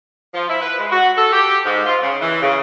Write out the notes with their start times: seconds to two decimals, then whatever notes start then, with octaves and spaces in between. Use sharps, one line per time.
0.34 F3
0.49 E4
0.61 B4
0.78 G#3
0.91 F#4
1.17 A4
1.32 G4
1.65 G#2
1.85 F4
2.01 C#3
2.21 E3
2.42 C#3